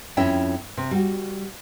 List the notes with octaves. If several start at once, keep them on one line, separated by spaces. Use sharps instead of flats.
F2 C#4 E4 E5 G5
C3
G3 F#4